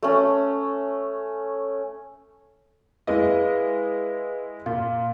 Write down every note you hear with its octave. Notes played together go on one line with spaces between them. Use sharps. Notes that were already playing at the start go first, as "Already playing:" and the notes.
A3 C#4
G#3 E4 G#4 B4 D#5 F5
A#2 F5